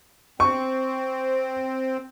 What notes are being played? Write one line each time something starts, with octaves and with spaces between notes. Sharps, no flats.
C4 C#6